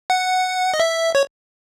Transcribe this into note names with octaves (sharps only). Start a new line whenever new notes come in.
F#5
D#5
E5
C#5